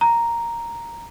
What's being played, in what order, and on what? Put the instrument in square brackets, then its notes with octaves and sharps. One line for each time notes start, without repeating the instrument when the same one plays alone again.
[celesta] A#5